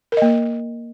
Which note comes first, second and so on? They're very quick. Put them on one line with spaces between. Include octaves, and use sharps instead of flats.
A#4 D#5 A#3